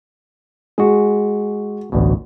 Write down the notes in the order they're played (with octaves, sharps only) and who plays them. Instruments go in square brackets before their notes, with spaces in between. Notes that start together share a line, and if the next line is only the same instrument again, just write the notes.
[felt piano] G#3 [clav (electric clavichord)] F#4 G#4
[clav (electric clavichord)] A1 D2 B2